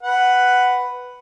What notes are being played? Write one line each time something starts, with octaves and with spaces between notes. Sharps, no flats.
B4 F#5